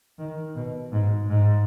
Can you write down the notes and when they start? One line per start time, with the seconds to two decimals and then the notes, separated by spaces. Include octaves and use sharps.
0.19 D#3
0.55 B2
0.92 G#2
1.29 G#2